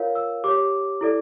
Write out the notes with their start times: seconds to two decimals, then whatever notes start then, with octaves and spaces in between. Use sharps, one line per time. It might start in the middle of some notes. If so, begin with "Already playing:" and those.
Already playing: F4 A#4 C#5 F5
0.15 E6
0.44 G4 C#5 D6
1.01 E4 A4 D5